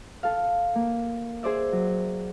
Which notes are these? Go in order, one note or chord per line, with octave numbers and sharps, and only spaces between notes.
A4 F5
A#3
G#4 C5 D5 E5
F#3